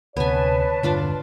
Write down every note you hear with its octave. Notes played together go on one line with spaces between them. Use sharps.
D2 C3 B3 B4 C#5 G#5 A5
E1 G2 D3 D4 F4 D5